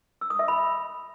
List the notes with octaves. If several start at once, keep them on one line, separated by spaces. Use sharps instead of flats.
E6
D#6
E5
B5